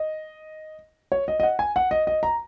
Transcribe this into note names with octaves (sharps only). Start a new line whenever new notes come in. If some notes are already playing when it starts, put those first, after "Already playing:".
Already playing: D#5
C#5
D#5
D#5
F#5
G#5
F#5
D#5
D#5
A#5